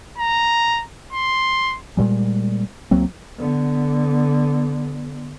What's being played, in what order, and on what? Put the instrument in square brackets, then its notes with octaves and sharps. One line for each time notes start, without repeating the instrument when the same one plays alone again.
[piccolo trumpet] A#5
C6
[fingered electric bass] A#2 G3 G#3
C#2 F#3 A#3 C4
[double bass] D3 B3